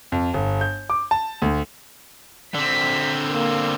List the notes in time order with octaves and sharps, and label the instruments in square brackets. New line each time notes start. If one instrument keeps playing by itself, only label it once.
[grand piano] F2
G1
G6
D6
A5
D2
[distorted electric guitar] D3 C4 [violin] B6
[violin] A#3